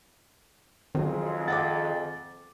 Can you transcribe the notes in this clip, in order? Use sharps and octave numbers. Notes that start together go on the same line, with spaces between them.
F2 D#3 F#3 G#3 C4
F#5 G5 D6 A6